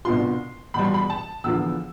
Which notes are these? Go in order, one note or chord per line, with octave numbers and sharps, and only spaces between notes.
C2 B2 B3 D4 F4 C6
E2 B2 G3 B5
C6
B5
A5
E2 D3 F3 B3 F4 E6